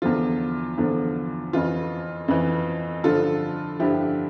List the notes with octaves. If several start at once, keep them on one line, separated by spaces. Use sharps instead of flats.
E2 D3 F3 F4
E2 D3 F3
F2 E3 F4
F2 E3
G2 D3 F3 F4 A4
G2 D3 F3 E4 G4